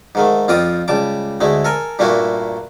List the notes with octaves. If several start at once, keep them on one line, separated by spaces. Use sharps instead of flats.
G#2 D#3 A3
F2 C4 F4 D5 D#6
C#2 G3 A5 D6
D2 G#3 A3 E4
A4 A#4 G#5
G2 A#2 A3 A#3 E4 F#4